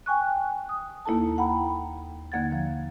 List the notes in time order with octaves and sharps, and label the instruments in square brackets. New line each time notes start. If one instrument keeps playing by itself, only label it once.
[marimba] G5 G#5 C#6 F#6
D#6
D#2 A#3 E4 A4 A5
F#5 G5 A#5 B5
D#2 D3 A#3 F#5 G#6 A6
F3